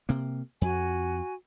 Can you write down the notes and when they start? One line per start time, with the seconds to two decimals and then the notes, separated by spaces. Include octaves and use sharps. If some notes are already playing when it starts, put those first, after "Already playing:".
0.09 C3 A#3
0.61 F2 F#4 G#5